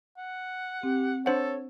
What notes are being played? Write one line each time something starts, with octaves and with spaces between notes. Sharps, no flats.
F#5
C4 G4
D4 A4 C5 C#5 F#5